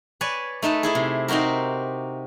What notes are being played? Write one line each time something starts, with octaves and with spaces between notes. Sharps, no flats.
B4 C#5 D5 G#5
A3 D#4 A4 B4
A3 E4 G#4
C3
C4 D#4 F#4 G4 A#4